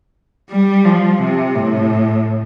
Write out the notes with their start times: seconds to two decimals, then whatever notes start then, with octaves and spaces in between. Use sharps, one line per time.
0.51 G3
0.86 F3
1.22 C3
1.56 A2